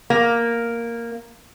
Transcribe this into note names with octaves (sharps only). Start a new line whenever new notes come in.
A#3